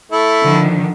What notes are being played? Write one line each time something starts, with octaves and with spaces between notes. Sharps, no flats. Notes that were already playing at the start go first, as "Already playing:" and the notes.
A3 E4
D3 D#3 F3